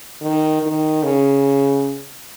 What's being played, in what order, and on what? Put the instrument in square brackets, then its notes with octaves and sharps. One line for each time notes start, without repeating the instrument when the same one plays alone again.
[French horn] D#3
D#3
C#3